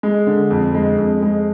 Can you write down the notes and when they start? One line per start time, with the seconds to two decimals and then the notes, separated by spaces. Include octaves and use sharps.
0.03 G#3
0.27 D3
0.50 F2
0.74 G#3
0.98 F2
1.22 G#3